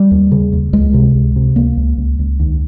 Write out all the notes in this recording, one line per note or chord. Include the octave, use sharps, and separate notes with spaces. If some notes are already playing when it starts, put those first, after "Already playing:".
Already playing: G3
D#2
C#3
D#2
C#2 G#3
C3
C#2
C3
C#2 A#3
C#2
C#2
C#2
D#2